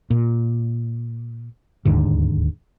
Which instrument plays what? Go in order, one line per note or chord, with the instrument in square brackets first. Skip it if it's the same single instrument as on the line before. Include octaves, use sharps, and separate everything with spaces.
[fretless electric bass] A#2
D1 D#2 G#2 D3